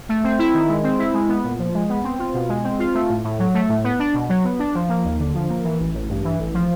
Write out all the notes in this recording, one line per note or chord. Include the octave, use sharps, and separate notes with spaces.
A3
C4
E4
D#3
G#3
C4
E4
G#3
B3
A#2
F3
G#3
B3
C4
F4
B2
G#3
C4
F4
A3
A2
A2
F#3
A3
A2
B3
D4
B2
F#3
B3
D4
F3
A#3
D#2
D3
F3
A#3
E3
A1
A1
G2
E3
A1
F3